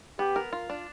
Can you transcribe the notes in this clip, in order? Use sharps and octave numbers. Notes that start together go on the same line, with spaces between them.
B3 G4
A#4
F4
D4